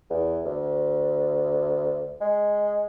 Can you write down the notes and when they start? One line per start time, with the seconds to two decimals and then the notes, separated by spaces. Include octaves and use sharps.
0.10 E2
0.46 D2
2.21 G#3